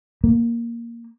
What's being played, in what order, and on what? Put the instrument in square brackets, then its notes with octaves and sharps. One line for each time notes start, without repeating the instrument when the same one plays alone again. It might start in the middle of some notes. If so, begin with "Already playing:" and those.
[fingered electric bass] A#3